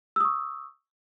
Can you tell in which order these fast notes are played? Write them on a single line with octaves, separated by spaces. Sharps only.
E6 D#6 C#6